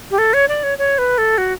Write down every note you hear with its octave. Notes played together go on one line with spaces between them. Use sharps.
G4
A4
C#5
D5
C#5
C#5
B4
A4
F#4